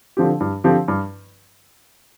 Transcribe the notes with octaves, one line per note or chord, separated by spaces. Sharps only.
D3 F3 C4 G4
G2
D3 F3 C4 G4
G2